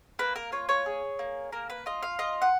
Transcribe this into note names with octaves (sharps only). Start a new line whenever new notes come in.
A#3 B4
A#4
F4 C#5
C#5
G#4
A#3
A#3 A#4
B4
F4 D#5
F5
F4 D#5
F#5